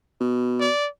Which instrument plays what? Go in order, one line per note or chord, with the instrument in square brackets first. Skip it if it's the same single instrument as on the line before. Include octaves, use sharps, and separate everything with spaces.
[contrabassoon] B2
[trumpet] D5